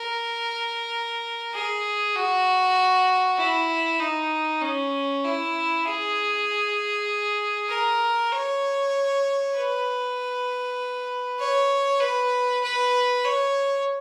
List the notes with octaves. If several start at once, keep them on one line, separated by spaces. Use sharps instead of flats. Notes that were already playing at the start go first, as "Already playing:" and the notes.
Already playing: A#4
G#4
F#4
E4
D#4
C#4
E4
G#4
A#4
C#5
B4
C#5
B4
B4
C#5